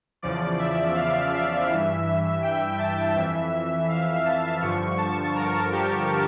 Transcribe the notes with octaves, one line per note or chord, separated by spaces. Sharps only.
E2 C#3 F3 D5
E5
F5
E5
G2 E3
G5
A5
F2 E3 E5
F5
A5
G2 D3 F3 C#6
A5
A#4
G4